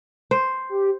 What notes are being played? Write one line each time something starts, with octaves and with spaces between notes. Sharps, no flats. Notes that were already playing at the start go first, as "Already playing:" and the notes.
C5
G4